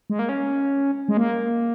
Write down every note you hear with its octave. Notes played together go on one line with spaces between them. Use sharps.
G#3
A#3
C#4
G#3
A#3